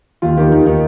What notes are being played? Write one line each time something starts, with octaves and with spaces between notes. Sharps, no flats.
D#2 F4
D#3 G4
D#2 D#4
D#3 D#4